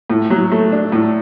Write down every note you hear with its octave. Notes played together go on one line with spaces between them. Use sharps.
A2
F#3
A3
D4
A2